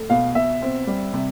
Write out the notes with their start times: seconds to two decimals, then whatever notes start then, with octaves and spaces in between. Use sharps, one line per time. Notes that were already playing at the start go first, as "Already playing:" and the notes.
Already playing: A3
0.10 B2 F5
0.35 B2 E5
0.62 C4
0.87 G3
1.13 C3